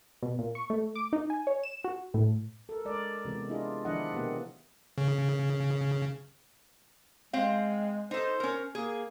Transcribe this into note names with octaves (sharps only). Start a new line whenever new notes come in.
B2
A#2
C#6
A3
D6
D#4
G#5
C#5
E7
F#4
A2
A4 A#4
G#3 A#4 D5
C3 E3 G#3 B3
D4 E4 F4 G#4 D#5
D#3 F3 D4 E4 D#5 F#5
B2 A#3 B3 G4 F#5
C#3
G#3 C4 F5
D#4 A4 C5
C#4 A#4
A#3 G#4